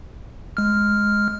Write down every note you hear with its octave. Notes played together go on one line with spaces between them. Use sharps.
G#3 F6